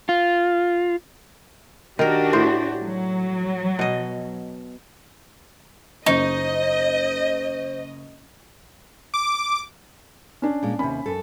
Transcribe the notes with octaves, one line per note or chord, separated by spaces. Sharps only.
F4
D#3 D4 F#4 G4 A#4
A2 C5
F#3
B2 D#5
F#1 D#4 C5 D#5 C#6
D6
C#4 D4
A#2 G#3
D#2 C3 C#4 B5
F#2 A4